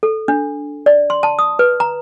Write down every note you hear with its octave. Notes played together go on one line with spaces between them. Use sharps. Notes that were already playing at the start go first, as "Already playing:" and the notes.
A4
D4
D5
C6
A5
D#6
B4
A#5